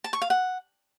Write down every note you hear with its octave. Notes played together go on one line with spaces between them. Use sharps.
A5
C#6
F5
F#5